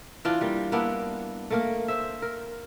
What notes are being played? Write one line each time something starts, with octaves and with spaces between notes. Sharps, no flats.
E3 D4 F4
G3 A#3
A#3 B3 D4 E4
A3 A#3 A#4
C5 E5
A#4